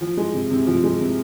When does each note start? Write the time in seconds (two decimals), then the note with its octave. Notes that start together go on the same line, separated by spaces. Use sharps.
0.01 F3
0.17 G#3
0.34 C3
0.51 C3
0.67 F3
0.84 G#3
1.00 C3